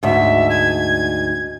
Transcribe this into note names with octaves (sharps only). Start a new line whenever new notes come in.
D2 G#2 E5
G#6